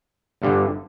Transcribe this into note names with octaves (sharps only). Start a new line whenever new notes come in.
G1 G2 D3